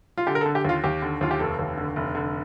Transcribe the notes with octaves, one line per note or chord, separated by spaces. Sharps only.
F4
D3 G4
A#4
A4
D3
G4
D#2 F4
D#2 G4
D3
D#2 F4
G4
F1 A4
D#2
D3
F1
D3